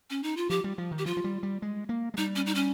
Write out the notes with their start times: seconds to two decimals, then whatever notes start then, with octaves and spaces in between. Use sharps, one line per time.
0.10 C#4
0.23 D#4
0.37 F4
0.50 F3 G4
0.64 G3
0.78 F3
0.91 D#3
0.98 G4
1.06 F3 F4
1.17 F3
1.24 G3
1.43 G3
1.62 G#3
1.89 A#3
2.14 G#3
2.17 G3 D#4
2.36 C#4
2.46 D#4
2.55 C#4